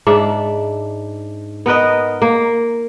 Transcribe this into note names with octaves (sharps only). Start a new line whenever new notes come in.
G#2 D4 E5
B3 A#4 B4 D#5
A#3